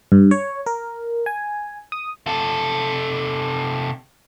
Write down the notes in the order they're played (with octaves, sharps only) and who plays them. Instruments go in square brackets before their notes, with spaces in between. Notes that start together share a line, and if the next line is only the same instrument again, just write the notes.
[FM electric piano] G2
C#5
A#4
G#5
D#6
[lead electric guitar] C3 A4